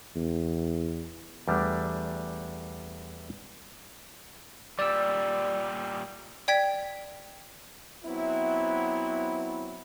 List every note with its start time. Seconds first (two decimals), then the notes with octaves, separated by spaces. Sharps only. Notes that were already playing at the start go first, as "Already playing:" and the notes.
0.16 E2
1.48 E2 G3 A3 D4
4.79 A#2 G3 D5 E6
6.48 D5 G5 G#6 B6
8.05 F#3 B3 C4 E4